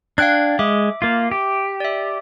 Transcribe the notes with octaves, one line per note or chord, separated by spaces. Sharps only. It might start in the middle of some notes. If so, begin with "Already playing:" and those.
D4 F5 G5 F#6 G#6
G#3 E5 D6
A#3 F4
G4
D5 E5